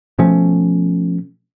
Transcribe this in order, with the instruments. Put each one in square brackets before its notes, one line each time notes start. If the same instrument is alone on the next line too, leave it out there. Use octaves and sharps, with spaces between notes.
[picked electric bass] B2 F3 A3 C#4